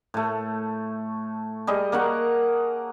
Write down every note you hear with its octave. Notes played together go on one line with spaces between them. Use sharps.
A2 A3
G3 G#4 D#5
A#3 A#4 C#5 F#5